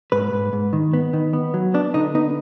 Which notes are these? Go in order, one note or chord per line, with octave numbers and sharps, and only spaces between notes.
G#2 B4
G#2
G#2
D#3
B3
D#3
B3
F#3
B3 D4
D3 D#4
B3 D#4